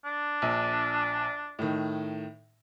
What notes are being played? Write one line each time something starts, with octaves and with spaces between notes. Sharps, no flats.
D4
A#1
A2 D#3